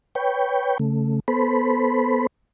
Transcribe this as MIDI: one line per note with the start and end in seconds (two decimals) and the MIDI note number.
0.15 0.78 71
0.15 0.78 73
0.15 0.78 79
0.79 1.20 49
0.79 1.20 57
1.28 2.27 59
1.28 2.27 69
1.28 2.27 72
1.28 2.27 83